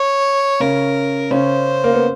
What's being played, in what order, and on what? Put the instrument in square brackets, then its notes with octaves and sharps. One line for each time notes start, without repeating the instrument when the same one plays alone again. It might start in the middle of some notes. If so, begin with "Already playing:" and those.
Already playing: [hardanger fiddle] C#5
[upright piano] C#3 C#4 [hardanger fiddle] A#4
[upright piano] C#3 C#4 [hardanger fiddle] C5
[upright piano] A#3
B3